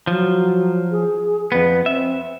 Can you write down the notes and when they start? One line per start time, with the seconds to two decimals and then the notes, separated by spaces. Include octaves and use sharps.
0.07 F3 F#3
0.91 G#4
1.52 F2 B3 B4
1.86 C4 E5